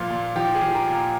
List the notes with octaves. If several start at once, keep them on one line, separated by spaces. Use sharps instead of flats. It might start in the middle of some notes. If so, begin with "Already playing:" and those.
Already playing: A#2 F3 F4
A#2
F3 G4
G#4
F3
A#4
A#2
A#4